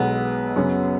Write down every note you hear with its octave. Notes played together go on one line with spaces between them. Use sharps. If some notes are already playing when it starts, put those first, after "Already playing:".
Already playing: B1 B2 G#3 B3
F#2 C#3 F#3 C#4 F#4